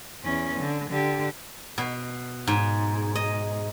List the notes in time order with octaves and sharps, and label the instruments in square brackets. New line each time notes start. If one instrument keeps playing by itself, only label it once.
[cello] E2 C#4
D3
D3 G4
[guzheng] B2
G#2
D#5